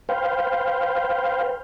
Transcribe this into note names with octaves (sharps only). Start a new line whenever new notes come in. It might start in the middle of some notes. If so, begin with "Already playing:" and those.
B4 C5 F5 G5